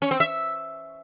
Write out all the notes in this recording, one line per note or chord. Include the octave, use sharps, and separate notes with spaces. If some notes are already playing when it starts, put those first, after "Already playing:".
C#4
C4
E5